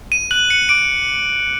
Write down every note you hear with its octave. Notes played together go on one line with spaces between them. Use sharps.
D#7
F#6 F#7
C#7
D6 D7